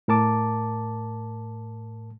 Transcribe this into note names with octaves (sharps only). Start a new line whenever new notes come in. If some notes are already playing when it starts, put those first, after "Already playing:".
A2 A#4 A5 D6